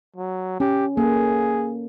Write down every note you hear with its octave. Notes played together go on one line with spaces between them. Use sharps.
F#3
C#4 G4
A#3 C#4 G#4 A4